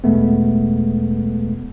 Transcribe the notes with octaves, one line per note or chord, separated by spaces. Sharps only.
E2 B2 G#3 A3 B3